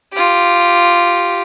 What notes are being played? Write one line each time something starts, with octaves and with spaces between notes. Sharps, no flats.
F4 G4